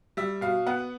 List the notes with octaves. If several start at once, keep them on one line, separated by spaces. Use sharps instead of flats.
G3 E5
B2 F5
B3 F#5